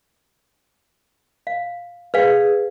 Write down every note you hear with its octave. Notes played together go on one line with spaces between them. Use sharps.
F5
G#4 B4 F5 G5